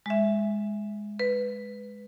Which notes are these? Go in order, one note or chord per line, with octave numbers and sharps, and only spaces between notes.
G#3 E5
B4